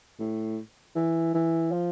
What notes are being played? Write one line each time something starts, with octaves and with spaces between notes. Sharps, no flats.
A2
E3
E3
F3